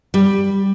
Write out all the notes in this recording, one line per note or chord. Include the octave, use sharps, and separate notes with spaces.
G3